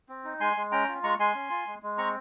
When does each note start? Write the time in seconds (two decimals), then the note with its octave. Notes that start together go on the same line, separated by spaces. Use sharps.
0.09 C4
0.24 D#4
0.40 G#3 G#5 C6
0.57 G#3
0.72 C#4 G5 A#5
0.88 F4
1.03 G#3 A#5 C#6
1.19 G#3 G#5 C6
1.34 C#4
1.50 F4
1.67 G#3
1.82 G#3
1.98 C4 A#5 C#6